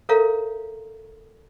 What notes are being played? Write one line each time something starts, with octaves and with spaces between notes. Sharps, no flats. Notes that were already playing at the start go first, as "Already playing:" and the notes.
A4 A#4 C#5 E5 F5 A#5